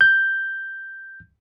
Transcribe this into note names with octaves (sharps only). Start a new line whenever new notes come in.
G6